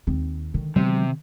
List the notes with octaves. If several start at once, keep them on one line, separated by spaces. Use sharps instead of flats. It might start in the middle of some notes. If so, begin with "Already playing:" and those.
D#2 C4
D3 D#3
C3 F#3 G#3 B3